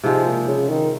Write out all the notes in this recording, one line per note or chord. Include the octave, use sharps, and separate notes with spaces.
G#2 C3 F3 G#3
A#2
C#3
D#3